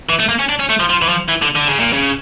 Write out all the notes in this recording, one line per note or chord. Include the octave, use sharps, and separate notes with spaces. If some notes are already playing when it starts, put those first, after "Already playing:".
E3
A3
A#3
C#4
D4
C#4
A3
F3
F3
E3
F3
E3
D3
D3
C#3
A#2
C#3